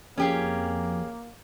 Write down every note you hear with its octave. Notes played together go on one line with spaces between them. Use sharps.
F2 A#3 C#4 G4 G#4